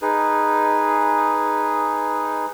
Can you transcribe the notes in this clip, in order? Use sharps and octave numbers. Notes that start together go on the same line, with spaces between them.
D#4 G#4 B4